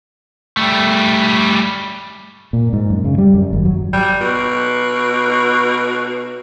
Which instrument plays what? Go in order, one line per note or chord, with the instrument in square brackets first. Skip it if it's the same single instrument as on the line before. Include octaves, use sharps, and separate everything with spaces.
[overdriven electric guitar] G3 A3
[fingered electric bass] A#2
G#2
F#2
C#3
G3
F#2
G#1
F#3
[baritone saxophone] G3
B2